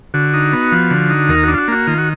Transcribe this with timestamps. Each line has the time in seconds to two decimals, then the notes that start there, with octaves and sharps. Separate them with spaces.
0.14 D3 F#4
0.34 D#4
0.53 B3
0.72 F3
0.91 D3
1.10 D#4
1.29 D#2 A#4
1.43 D4 F#4
1.54 F4
1.58 F#4
1.68 A#3 F#4
1.87 D#3 F4
1.98 F#4